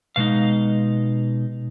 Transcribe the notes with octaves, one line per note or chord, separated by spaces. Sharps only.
B2 G#3 D#4 F5